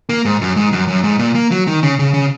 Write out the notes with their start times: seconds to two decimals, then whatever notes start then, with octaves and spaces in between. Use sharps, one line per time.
0.09 A#3
0.25 G#2
0.41 F#2
0.57 G#2
0.73 F#2
0.88 F#2
1.04 G#2
1.19 A#2
1.35 A#3
1.51 F#3
1.67 D#3
1.83 C#3
1.99 C#3
2.14 C#3